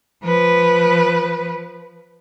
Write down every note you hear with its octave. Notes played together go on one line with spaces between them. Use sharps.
F3 B4